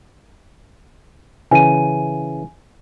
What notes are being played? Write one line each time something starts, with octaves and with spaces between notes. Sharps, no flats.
C#3 E3 G#5 D#7